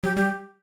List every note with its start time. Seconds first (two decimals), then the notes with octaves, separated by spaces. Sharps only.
0.04 F#3 G4
0.17 G3 G4